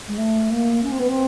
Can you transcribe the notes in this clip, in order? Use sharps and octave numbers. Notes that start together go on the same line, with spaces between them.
G#3
A3
A#3
C#4
C4
B3
C4